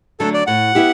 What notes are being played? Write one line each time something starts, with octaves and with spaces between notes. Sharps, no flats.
D3 F#3 A3 D4 A4
D5
A2 F#5
B3 E4 G4